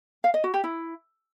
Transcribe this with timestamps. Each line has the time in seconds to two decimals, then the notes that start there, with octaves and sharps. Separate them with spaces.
0.24 F5
0.34 D#5
0.44 F#4
0.54 G4
0.64 E4